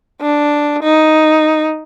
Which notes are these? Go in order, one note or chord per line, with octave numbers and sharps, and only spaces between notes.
D4
D#4